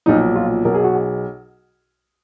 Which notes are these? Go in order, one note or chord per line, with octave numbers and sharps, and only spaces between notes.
B1 A#2 F3 D#4
F4
B1 B2 A#4
G#4
F#4
G#4